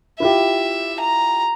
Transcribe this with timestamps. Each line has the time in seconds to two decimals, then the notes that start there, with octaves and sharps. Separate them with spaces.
0.20 E4 F4 G4 E5
1.01 A#5